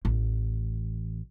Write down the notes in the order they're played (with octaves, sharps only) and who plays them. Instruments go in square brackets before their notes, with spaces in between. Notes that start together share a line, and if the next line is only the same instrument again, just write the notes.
[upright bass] A1